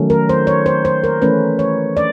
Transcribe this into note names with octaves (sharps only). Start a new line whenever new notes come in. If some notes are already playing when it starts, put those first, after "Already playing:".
Already playing: D#3 F#3 A3 C#4
A#4
C5
C#5
C5
C5
A#4
E3 A3 C#4 B4
C#5
D5